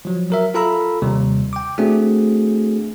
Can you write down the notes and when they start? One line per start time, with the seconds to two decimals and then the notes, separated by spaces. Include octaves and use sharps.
0.05 F3 F#3
0.30 F#3 A#4 E5
0.54 F4 A4 F5 A#5 B5 E6
1.02 D#2 C3 G3
1.53 G5 D6
1.78 A3 C4 D4 F#4 G#4